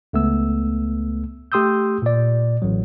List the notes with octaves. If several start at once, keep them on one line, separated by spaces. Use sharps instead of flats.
C#2 A3 B3 E6
A3 G4 C6 D#6 E6 G6
A#2 D5
A1 F#3